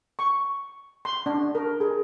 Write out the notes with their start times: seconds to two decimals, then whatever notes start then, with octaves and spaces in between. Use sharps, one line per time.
0.19 C#6
1.05 C6
1.26 D4
1.55 A#4
1.80 G#4